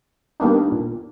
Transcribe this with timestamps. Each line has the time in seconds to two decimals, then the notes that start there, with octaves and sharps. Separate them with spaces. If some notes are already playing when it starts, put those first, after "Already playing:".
0.40 D#3 G3 A#3 B3 D4 D#4
0.72 A#2